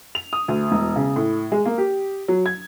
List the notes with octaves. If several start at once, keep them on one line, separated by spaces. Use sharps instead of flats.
F7
D#6
D2
E1
C#3
A2
G#3
A#3
G4
F#3
G#6